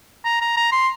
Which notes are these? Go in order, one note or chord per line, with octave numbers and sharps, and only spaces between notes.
A#5
A#5
A#5
C6